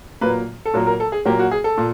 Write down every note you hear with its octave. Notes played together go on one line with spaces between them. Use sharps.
A#2 F#3 A#3 B4
A4
A#2 F#3 A#3 A#4
A#4
A4
G#4
A#2 F#3 A#3 G4
F#4
G#4
A4
A#2